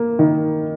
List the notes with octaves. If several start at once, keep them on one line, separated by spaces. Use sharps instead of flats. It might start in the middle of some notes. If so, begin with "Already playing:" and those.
Already playing: A#3
D#3